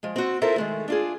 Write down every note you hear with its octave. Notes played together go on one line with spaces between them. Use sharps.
F3 G#3
C4 F#4
E4 F4 A4 A#4 C5 E5
D#3 G#3 A3
D4 F4 G#4